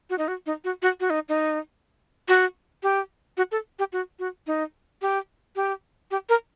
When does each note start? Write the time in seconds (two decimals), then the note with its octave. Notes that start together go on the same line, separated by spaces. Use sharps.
0.10 F#4
0.18 D#4
0.28 F#4
0.46 D#4
0.64 F#4
0.82 F#4
1.00 F#4
1.10 D#4
1.29 D#4
2.28 F#4
2.83 G4
3.37 F#4
3.51 A4
3.79 G4
3.93 F#4
4.19 F#4
4.47 D#4
5.02 G4
5.56 G4
6.11 G4
6.29 A#4